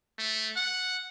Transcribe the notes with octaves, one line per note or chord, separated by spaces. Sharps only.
A3
F#5